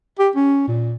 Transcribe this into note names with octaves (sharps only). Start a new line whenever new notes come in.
G4
C#4
A#2